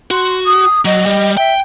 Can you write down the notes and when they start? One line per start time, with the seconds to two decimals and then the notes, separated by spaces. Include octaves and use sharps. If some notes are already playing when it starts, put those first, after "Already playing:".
0.11 F#4 C6
0.45 D#6
0.85 F#3 D#5
1.06 G3
1.37 E5 G5